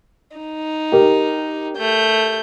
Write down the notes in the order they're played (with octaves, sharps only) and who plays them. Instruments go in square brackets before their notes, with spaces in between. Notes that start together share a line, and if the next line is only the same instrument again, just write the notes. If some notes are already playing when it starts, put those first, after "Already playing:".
[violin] D#4
[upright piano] G4 A#4
[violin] A3 G6